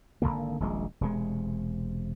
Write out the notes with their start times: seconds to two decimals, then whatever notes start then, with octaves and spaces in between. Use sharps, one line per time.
0.22 G#1 F#2 D3 A#3
0.60 D#1 A#1 G#3
1.01 E1 C3 G#3